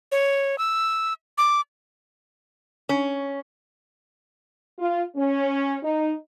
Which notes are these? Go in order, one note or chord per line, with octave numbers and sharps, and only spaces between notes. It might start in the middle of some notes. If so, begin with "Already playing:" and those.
C#5
E6
D6
C#4
F4
C#4
D#4